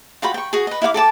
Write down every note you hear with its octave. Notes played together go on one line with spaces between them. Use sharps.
F4 F#4 G5 B5
G5 C#6
F#4 G#4
B4 D#5
E4 F5 F#5 D6
A4 G5 A5 D6